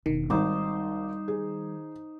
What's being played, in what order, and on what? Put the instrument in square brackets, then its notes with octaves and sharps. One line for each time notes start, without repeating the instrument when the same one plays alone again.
[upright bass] E1 [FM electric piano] D#3
[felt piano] G#1 [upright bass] G3 E4 [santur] D#4 C5 D6
[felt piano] G#4